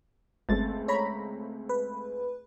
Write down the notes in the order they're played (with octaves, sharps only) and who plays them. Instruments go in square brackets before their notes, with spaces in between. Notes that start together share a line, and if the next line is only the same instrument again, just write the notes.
[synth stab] G1 A6 [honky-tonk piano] C#2 A3 C4
[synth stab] C#5 A#5 B5
[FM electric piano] B4